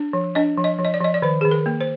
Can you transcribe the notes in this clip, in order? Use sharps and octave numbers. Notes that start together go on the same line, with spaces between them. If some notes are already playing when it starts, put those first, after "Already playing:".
Already playing: D4
F3
D4 D#5
F3
D#5
F3
D#5
D5
F3 D#5
D5
D#3 C5
D#3 G#4
A#4
A#3
C5